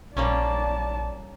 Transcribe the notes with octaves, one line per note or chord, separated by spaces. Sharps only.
A#1 G3 A#3 C#4 D5 A5